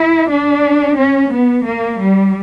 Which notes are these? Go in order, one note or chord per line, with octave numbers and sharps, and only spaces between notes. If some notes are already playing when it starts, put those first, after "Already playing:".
Already playing: E4
D4
C#4
B3
A#3
G3